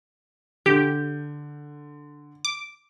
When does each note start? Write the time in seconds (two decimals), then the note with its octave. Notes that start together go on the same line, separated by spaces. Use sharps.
0.66 D3 G4 G6
2.45 D6